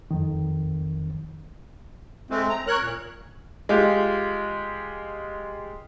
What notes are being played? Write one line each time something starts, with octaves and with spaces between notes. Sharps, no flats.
F2 D#3
G#3 A3 C4
A#5
A#4 C#5 F#6
A#2
G#3 F4 G4